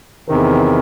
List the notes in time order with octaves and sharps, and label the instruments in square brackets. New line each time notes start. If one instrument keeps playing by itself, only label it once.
[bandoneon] E2 C3 D#3